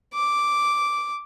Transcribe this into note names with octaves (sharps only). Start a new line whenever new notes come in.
D6